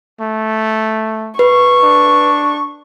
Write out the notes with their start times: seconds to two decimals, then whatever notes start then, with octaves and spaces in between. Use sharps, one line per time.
0.20 A3
1.39 B4 C#6
1.82 D4